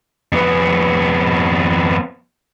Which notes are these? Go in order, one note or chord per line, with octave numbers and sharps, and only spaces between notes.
F2 B3